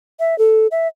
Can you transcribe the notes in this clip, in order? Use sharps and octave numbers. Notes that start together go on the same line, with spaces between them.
E5
A4
E5